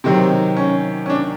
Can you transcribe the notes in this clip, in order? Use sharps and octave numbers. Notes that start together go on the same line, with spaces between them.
C3 D#3 F#3 C4
C#4
C#4
D4